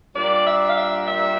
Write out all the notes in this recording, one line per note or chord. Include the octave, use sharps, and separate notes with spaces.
A#2 G3 A#3 D4 D5
E5
F5
E5
E5